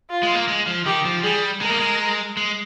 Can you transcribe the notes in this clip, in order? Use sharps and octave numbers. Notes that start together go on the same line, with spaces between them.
F4
G#3
A#3
G#3
F3
D#3 G4
F3
G3 G#4
G#3 A#4
A#3
G#3
G#3